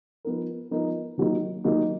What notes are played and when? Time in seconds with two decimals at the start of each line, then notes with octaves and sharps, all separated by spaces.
0.25 F3 B3 D#4 A#4
0.71 F3 B3 D#4 A#4
1.18 D#3 F#3 A#3 D#4
1.64 D#3 F#3 A#3 D#4